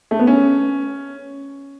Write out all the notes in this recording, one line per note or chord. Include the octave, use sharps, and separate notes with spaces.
A3
B3
C#4